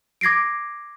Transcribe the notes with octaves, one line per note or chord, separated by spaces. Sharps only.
D6 G#6 A#6 C7 D7